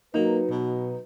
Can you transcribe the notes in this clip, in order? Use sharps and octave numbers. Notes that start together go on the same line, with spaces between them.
F#3 A#3 D#4 B4
B2